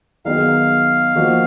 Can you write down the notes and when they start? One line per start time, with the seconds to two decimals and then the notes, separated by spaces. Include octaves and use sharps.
0.25 D#3 F#3 B3 D#4 G#4 F5
1.16 F3 A#3 D#4 F#4